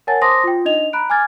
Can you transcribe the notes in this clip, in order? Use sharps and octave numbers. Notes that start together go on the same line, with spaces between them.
A#4 C#5 F#5 G#5 A5 A6
C5 A5 C6 D6 D#6 A#6
F4 G5
D4 D#4 D#5 F7
A#5 B5 F#6 D7
G#5 D6 F6 G#6 A6